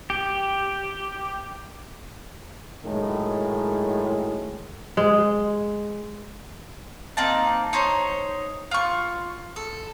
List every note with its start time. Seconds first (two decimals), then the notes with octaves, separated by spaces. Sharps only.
0.10 G4
2.84 F#2 A2 D#3 G#3
4.97 G#3
7.17 A#3 C4 D#4 A5
7.73 D#4 C5 C#5
8.71 F4 C#6
9.56 A4